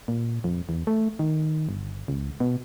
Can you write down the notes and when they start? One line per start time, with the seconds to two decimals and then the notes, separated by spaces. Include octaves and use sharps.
0.08 A#2
0.44 F2
0.69 E2
0.87 A3
1.19 D#3
1.69 G1
2.08 C#2
2.40 B2